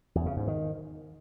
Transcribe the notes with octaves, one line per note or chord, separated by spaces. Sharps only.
E2
C#3
G#2
D#3